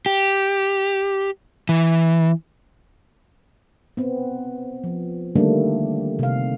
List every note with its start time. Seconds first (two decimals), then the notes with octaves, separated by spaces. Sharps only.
0.06 G4
1.69 E3
3.97 B3 C4
4.84 F3
5.35 D3 D#3 G3 A3 A#3 D4
6.19 C3 F5